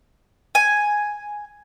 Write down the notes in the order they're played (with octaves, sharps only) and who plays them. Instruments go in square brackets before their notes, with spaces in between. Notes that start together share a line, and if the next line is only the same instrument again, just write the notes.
[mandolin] G#5